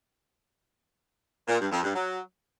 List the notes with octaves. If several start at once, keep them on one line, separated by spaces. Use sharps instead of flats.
A#2
G2
F2
G2
F#3